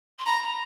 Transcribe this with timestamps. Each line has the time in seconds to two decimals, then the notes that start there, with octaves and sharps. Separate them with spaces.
0.19 C6
0.26 A#5 B5
0.40 A#5